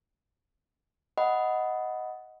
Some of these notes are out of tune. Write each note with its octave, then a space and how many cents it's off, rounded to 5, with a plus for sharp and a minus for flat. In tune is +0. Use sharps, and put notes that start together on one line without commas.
D#5 +10 F#5 +0 B5 +0